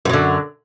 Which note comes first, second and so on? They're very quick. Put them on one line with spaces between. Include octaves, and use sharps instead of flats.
F#2 F#3 D3